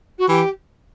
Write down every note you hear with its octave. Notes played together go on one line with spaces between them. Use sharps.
F#4
E3 G4